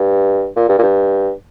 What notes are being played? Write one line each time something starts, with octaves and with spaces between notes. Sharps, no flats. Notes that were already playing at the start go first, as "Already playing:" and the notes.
Already playing: G2
A#2
G2
A#2
G2